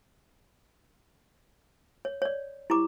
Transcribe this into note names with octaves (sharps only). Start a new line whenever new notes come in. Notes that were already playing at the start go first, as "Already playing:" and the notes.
C#5
C#5 D5
E4 G4 A#5 D6